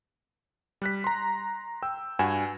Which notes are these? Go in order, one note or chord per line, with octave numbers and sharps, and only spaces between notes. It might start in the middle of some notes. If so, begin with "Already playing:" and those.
G3 F#6 B6
A#5 C6
G5 E6
G2 F#4 F#5 G#5 E7